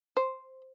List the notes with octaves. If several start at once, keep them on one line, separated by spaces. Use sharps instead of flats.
C5